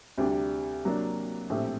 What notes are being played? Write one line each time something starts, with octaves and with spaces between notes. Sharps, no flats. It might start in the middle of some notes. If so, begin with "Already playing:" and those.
D2 C3 G3 D4 G4
C3 F#3 A#3 D4
A#1 A2 A3 C4 G4